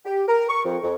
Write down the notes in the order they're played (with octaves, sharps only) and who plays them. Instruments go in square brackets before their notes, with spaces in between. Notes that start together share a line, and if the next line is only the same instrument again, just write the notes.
[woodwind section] G4
A#4
C#6
F2
F2